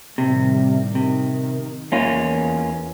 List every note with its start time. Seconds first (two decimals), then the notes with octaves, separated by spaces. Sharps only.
0.18 A2 C3 D#3 G3
0.95 C3 D#3
1.92 E2 A#3 C#4 F4